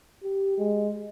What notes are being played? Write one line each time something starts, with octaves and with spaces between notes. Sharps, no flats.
G4
G#3